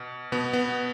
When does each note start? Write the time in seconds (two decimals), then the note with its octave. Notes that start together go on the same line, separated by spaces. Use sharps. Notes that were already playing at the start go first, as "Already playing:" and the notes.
Already playing: B2
0.32 B2 B3
0.53 B3